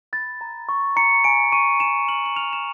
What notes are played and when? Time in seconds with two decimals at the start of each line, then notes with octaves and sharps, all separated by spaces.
0.13 B5 A6
0.41 A#5
0.69 C#6
0.96 A#5 C#7
1.24 G#5 D7
1.52 C#6 D#7
1.80 G#5 E7
2.08 F6 F#7
2.26 F#7
2.36 F6 F7
2.53 E7